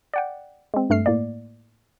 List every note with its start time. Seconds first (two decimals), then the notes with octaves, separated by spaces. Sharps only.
0.14 D5 F#5 G5
0.74 G#3 C4
0.90 G2 A3 F6 C7
1.06 A2 A#3 D5